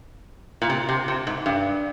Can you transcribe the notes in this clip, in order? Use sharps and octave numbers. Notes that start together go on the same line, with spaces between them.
A#2
C3
C3
C3
G#2
G2